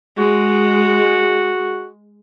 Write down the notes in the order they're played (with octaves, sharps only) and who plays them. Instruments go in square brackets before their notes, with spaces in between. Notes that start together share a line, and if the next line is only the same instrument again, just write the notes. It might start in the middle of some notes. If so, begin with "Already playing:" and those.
[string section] G#3 [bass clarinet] F#4